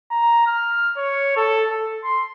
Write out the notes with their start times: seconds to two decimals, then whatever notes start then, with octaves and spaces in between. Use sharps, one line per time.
0.11 A#5
0.47 F6
0.97 C#5
1.37 A4
1.70 A4
2.04 C6